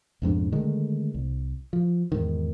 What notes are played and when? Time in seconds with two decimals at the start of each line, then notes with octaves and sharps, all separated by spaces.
0.22 B1 F2 G#2 D4
0.52 D3 D#3 G#3 A3
1.14 C2
1.73 F3
2.12 E2 G#2 D#3